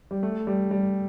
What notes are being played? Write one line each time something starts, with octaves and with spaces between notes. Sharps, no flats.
G3
A3
G3
G3